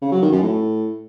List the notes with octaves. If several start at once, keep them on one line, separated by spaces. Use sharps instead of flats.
C#3
F#3
D#3
F#2
A2